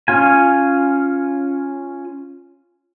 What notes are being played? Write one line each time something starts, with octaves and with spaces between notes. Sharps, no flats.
C#4 F4 G#5